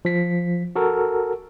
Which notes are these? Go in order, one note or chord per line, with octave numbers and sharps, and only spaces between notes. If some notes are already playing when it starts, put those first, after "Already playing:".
F3 B6
F#4 A4 A#4